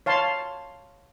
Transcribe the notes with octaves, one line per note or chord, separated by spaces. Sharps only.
C#5 F5 A5 C6